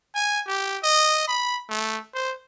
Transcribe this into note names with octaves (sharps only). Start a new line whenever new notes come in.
G#5
G4
D#5
B5
A3
C5